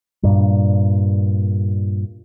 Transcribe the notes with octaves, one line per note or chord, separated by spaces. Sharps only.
G2 A#2 G3